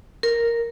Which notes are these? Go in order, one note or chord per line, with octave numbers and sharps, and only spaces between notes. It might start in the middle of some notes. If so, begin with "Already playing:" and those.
A#4